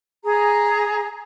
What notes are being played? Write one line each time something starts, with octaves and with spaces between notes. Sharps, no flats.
G#4 A#5